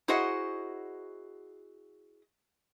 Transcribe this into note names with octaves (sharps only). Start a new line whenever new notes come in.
E4 F#4 G#4 C5 D#5 F#5